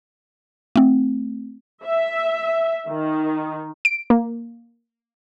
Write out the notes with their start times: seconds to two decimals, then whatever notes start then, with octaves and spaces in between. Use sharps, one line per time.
0.76 A3 C4
1.84 E5
2.87 D#3
3.85 D7
4.10 A#3